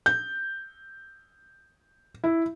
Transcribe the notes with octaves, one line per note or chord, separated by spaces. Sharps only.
G6
E4